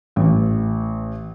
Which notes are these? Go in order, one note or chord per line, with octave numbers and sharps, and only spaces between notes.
A1